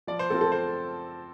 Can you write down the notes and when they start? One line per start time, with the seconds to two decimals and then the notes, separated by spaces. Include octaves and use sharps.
0.07 F3 D5
0.19 C5
0.30 A3 C4 F4 A4
0.41 A4
0.52 C5